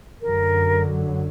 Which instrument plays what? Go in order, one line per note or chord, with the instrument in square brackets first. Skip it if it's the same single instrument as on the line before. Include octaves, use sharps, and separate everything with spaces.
[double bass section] F#2 D3 F#3 [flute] A#4